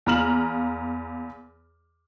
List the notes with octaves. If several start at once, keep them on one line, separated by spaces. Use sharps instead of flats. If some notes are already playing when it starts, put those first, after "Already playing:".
E2 A#3 A#5 F6 E7 F#7